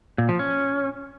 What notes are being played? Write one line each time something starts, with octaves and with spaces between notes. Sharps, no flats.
A#2
F3
C#4